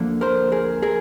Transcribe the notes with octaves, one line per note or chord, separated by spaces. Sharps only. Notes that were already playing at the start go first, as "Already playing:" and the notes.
Already playing: D2 D3 F3 A#3
A#4 C5
G#4 A#4
G#4 A#4